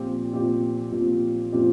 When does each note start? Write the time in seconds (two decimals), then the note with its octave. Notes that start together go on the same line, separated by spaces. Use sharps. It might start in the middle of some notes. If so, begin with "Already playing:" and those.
Already playing: A#2 F3 C4 G4
0.33 A#2 F3 C4 G4
0.92 A#2 F3 C4 G4
1.52 A#2 F3 C4 G4